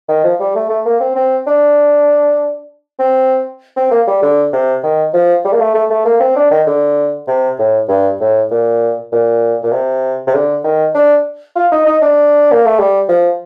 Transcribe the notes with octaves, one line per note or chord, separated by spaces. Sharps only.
D#3
F3
G3
A3
A3
A#3
C4
C4
D4
C4
C4
A#3
G3
D3
C3
D#3
F3
G3
A#3
A3
A3
A3
A#3
C4
D4
D#3
D3
C3
A2
G2
A2
A#2
A#2
A#2
C3
C3
D3
D#3
D4
F4
D#4
D#4
D4
A#3
A3
G3
F3